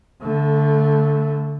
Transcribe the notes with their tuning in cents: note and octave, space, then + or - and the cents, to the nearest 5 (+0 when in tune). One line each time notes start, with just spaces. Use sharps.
D3 -20 A3 +0